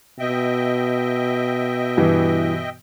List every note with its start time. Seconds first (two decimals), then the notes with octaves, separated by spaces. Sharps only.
0.19 B2 D#5 E5 G5
1.97 G2 E3